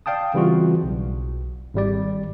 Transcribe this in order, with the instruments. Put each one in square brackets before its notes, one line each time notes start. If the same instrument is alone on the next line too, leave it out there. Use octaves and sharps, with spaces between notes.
[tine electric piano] D5 F5 G5 A5 D#6
C#3 E3 G3 C4 F4 F#4
B1
G#1 G3 D5